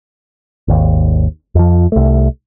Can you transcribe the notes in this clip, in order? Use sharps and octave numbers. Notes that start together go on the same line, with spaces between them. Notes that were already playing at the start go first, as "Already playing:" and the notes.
G#1 D#2
F2 F3
C2 A3